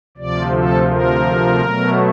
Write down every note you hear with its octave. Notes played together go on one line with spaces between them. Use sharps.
D2 C3 F3 D5
A4
A#4
B2 F#3 A3